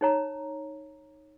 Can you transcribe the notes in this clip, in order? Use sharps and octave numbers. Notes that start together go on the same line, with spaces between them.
D#4 C#5 A#5